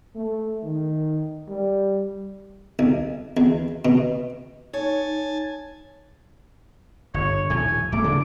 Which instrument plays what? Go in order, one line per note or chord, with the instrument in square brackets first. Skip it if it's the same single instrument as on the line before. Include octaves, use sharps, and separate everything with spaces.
[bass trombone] A3
D#3
G3
[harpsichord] B1
E2
B2
[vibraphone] D#4 [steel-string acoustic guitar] C#5 [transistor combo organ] G#5 A5
[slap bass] G1 [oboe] C#5
[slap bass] D#1 A2 F3 [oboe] G#5
[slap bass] D1 A3 [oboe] D6
[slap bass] C#3 D4